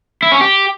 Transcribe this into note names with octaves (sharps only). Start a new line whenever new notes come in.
E4
C#4
G4